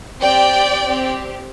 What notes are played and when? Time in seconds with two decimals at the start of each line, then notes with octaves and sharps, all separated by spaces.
0.22 C4 G4 D5 G5
0.83 C4 G4